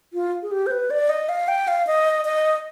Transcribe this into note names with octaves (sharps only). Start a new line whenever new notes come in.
F4
G#4
G4
C5
B4
D5
D#5
F5
G5
F5
D#5
D#5